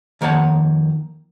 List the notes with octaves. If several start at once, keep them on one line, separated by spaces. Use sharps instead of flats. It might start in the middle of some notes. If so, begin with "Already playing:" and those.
F2 D#3 A#3 C#5 F#5 A5